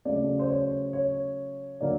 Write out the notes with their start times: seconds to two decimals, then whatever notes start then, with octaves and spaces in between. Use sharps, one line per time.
0.05 C#3 F#3 A3 D5
0.39 C5
0.49 C#5
0.93 C#5
1.81 D3 F#3 A#3 D5